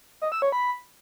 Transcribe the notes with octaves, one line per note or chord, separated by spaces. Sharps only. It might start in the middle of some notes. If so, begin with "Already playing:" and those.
D#5
E6
C#5
B5